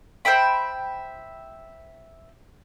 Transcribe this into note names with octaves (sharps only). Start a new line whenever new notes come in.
C5 E5 G5 B5